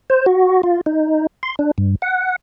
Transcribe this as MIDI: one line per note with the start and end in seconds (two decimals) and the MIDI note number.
0.10 0.26 72
0.26 0.62 66
0.63 0.81 65
0.86 1.26 63
1.43 1.55 84
1.59 1.71 62
1.78 1.95 43
2.02 2.36 78